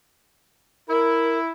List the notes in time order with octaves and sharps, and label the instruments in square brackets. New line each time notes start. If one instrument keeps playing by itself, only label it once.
[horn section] E4 [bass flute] A#4